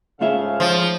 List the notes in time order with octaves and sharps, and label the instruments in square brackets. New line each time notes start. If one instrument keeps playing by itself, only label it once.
[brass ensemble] G#2 C#3 F5 [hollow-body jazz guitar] A3 F4 E5
[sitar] F3